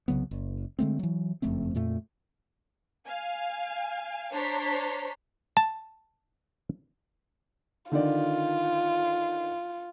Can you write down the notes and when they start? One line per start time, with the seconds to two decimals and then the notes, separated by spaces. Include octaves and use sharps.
0.08 C2 C#3 F#3 B3
0.31 F#1
0.79 D3 G#3 A3 C4
0.99 E3 F#3
1.42 F#1 F2 A3 C4
1.75 F2 A#2 A3
3.06 F5 G#5
4.33 D4 C5 C#5 A#5 C6 B6
5.57 A5
7.92 D3 D#3 F4 D5